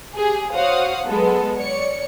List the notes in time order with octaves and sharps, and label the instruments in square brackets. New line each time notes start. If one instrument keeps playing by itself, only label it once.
[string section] G4 G#4
F#4 C5 C#5 F5 F#5 D#6
F#3 G#3 B3 A4
C#5 D5 C#7